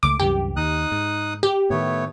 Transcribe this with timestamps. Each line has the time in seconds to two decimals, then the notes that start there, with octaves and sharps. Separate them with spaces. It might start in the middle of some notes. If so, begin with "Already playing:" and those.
0.03 C#2 F#3 A3 D6
0.20 C2 F#2 E3 G4
0.56 D#2 D#4 D#6 F#6
0.92 G#2
1.43 G4
1.70 A2 D#3 A3 B3 C#5